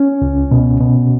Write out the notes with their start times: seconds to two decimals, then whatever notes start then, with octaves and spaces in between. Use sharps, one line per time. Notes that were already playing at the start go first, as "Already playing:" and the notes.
Already playing: C#4
0.22 C#2
0.51 B2
0.80 B2